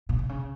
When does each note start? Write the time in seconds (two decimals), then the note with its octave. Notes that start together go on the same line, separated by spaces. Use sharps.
0.09 A#2
0.19 C3
0.29 C#3